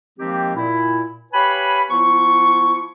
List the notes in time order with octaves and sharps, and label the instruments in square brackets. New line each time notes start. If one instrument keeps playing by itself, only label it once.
[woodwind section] D#3 F3 G#3 A#3 C4 G4
A#2 E4
G4 B4 C#5 F5 G#5 B5
F3 B3 E4 C#6